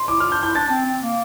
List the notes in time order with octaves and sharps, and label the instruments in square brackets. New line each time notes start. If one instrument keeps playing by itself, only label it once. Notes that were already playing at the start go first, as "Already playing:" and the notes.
Already playing: [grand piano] C6
[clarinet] E4 [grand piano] D6
[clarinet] F4 [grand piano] F6
[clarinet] D4 [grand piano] G6
[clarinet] E4 [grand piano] G6
[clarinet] D4 [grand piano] A6
[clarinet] C4
C4
A#3